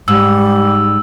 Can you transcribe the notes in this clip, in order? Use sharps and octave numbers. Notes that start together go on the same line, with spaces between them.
G#2 G3 E6